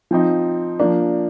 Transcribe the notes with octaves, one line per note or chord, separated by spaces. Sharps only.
F3 C4 D#4
F3 A#3 D4